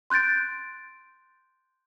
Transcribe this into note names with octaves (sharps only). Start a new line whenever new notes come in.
C6 F#6 G6 A6 D7